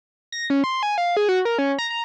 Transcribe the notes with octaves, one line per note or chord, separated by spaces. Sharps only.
A#6
C#4
C6
G#5
F5
G#4
F#4
A#4
C#4
A#5
A#5